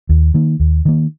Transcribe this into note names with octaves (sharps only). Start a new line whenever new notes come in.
D#2
D#3 A#3
D#2
D#3 A#3